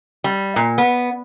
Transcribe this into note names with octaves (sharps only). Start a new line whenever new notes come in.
G3
A#2
B3